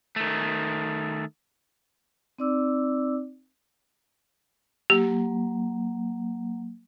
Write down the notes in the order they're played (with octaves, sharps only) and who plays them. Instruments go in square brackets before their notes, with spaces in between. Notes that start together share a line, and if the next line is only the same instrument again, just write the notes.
[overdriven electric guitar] D#3 A3
[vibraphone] C4 D#4 D5 D6 E6
[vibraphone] F#3 A#3 [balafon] G4